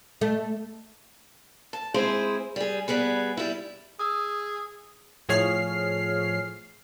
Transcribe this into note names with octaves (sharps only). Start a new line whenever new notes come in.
A3
A5
G#3 C4 E4 G#4 C5
G3 G#4
G3 B3 G#4 B4
G3 E4
G#4 D#6 E6
A2 F3 G#4 C#5 F6 C7